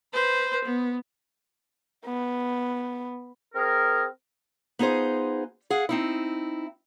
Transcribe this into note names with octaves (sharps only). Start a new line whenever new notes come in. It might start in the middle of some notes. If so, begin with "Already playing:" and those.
B4 C5
B3
B3
C4 G#4 A#4
B3 D#4 F4 G#4 C5
G#4 F5 F#5
C4 D#4 E4